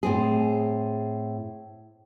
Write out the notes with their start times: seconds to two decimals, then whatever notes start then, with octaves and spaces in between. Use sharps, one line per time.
0.03 A2 C4 G#4